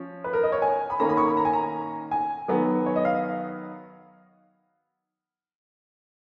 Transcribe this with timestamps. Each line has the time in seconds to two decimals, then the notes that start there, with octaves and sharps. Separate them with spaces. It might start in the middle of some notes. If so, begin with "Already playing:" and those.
Already playing: F3 C#4
0.24 B4
0.33 A#4
0.43 D#5
0.52 C#5
0.62 G#5
0.90 B5
1.00 D#3 A#3 C#4 A#5
1.09 B5
1.17 C#6
1.28 B5
1.37 A#5
1.45 G#5
1.53 A#5
2.11 G#5
2.48 D#3 F#3 B3
2.86 C#5
2.96 D#5
3.05 F5